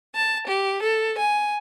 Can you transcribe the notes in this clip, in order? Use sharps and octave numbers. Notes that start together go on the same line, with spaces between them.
A5
G4
A4
G#5